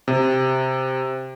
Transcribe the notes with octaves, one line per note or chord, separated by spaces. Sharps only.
C3